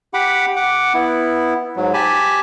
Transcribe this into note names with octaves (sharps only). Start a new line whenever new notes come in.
G4 F#5 B5 D6
F#5 D6
B3 E4
G#2 F#3
G4 G#5 A5 B5